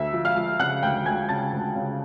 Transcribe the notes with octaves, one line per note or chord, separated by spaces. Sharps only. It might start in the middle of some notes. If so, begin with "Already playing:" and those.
Already playing: D2 E5 E6
F3
F5 F6
F3
C#3 F#5 F#6
D2 G5 G6
D2 G#5 G#6
C#3 A5 A6
D2
C#3